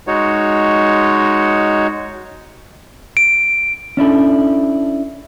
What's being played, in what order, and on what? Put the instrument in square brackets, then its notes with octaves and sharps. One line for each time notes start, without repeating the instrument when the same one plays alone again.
[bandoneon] G#3 D#4 F#4 C#5
[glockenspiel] D7
[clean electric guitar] C#4 D4 E4 A4